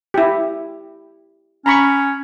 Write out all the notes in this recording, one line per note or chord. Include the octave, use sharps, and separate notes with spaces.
E4 G4
C#4 A#5 B5 C#6